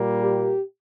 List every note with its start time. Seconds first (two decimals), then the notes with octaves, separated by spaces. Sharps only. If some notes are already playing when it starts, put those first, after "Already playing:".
Already playing: A#2 G3 A#3
0.21 G4